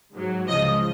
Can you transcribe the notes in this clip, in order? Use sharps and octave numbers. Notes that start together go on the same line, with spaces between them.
G#2 F#3
C#2 C#3 F3 D#5